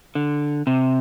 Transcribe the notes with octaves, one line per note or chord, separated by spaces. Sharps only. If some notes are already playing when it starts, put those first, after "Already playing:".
D3
C3